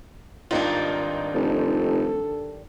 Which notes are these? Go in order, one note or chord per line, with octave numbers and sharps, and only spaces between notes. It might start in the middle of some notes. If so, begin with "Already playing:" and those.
G#1 G2 D#3 D4 D#4 F4
F1 A4